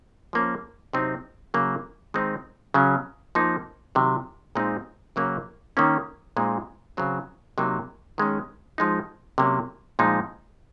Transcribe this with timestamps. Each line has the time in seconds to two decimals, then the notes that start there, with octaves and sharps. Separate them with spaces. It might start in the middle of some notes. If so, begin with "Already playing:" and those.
0.33 F3 A#3 C#4
0.93 C3 F#3 C4 D#4
1.54 C#3 F#3 A#3
2.14 D#3 G#3 C4 D#4
2.74 C#3 F#3 C#4
3.35 F3 A#3 D#4
3.95 C3 D#3 F#3
4.55 A#2 G#3 C4 D#4
5.16 C#3 F#3 A#3 C#4
5.77 D#3 A#3 C#4
6.37 A#2 G#3 C4 D#4
6.97 C#3 F#3 C4
7.58 C3 F#3 A#3 D#4
8.18 D#3 G#3 C#4
8.78 F3 G#3 D#4
9.38 C3 F#3 A#3 C#4
9.99 A#2 F3 G#3 D#4